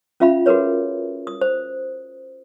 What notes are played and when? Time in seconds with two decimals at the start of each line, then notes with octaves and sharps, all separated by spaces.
0.20 C#4 F4 E5 F5 B5
0.46 F#4 G#4 A#4 B4 C#5
1.27 D#6
1.41 C5